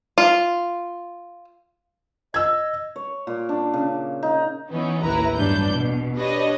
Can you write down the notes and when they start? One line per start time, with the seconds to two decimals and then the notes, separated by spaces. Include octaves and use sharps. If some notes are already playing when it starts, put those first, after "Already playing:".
0.18 F4
2.34 D#5 E6 G#6
2.96 C#5
3.27 A#2
3.49 D4
3.74 C#3
4.23 D#4
4.70 E3 B3 C#4 D#4
5.02 A1 D#2 E4 B4 A#5
5.36 E2 G2 F#3 D4 B4 G6
5.74 B2
6.16 D4 G4 B4 C#5 D#5